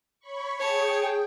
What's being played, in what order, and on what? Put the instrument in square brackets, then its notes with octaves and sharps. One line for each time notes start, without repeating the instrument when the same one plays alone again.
[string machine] C#5 B5 C#6
[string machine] G#4 G5 [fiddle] C#5 A5